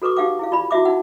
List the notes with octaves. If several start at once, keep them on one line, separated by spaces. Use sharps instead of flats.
F#4 A4 B4 C#6 D6
D#4 G4 F5 F#5 D6
E4 G#4 F5
F4 D5 B5
E4 F#4 E5 D6
D#4 F#5